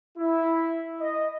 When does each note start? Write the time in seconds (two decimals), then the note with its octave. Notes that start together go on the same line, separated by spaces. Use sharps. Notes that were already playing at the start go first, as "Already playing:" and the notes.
0.18 E4
1.00 D#5